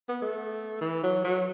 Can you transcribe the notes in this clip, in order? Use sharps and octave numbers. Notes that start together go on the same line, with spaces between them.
B3
A3
E3
F#3
F#3